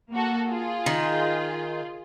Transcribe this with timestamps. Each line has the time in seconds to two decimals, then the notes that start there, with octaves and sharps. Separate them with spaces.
0.13 A#3 F#4 A4
0.49 F4 G#4
0.86 D#3